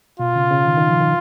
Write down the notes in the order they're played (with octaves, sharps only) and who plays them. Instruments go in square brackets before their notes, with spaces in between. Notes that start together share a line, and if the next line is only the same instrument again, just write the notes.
[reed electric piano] B2 [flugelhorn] F4
[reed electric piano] C#3
C#3
D#3
D#3
F3
D#3